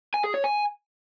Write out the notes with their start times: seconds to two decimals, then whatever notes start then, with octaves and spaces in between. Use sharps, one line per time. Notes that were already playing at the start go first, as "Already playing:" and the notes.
0.14 G#5
0.24 G#4
0.34 C#5
0.44 G#5